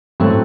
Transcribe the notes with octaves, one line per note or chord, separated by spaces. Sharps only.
A2 F#3 C4 F#4 A4